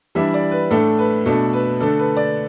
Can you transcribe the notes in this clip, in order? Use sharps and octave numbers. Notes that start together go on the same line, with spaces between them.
E3 G3 D4 E5
D5
B4
A2 A3 D4 A4
B4
B2 A3 D4 A4
B4
D3 A3 D4 A4
B4
D5